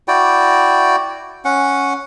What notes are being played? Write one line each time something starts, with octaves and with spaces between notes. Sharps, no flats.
E4 F#4 D5 G5
C#4 F#5